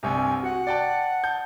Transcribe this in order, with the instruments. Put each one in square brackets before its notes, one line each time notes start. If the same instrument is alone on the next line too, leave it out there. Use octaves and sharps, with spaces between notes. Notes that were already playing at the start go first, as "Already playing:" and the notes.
[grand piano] C2 G2 C3 [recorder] G#5
[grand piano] F#4 [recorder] F#5
[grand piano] D5 G5 A5
A5 G6